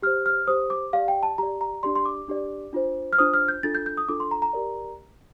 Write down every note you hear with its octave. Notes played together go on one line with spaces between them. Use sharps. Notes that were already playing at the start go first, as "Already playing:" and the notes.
G4 C5 F6
F6
G4 C5 D#6
D6
G4 D5 F5
G5
A5
G4 D5 A#5
A#5
D4 G4 D5 C6
C6
D6
D4 G4 D5
D4 F4 C5
F6
D4 F4 C5 D#6
F6
G6
D4 F4 A4 A6
G6
G6
D#6
D4 F4 A4 D6
C6
A#5
A#5
G4 A#4 D5